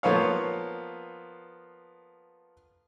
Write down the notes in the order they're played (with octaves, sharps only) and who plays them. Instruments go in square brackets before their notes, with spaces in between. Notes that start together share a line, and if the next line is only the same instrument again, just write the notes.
[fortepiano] F3 A#3 B3 A4 C#5 F5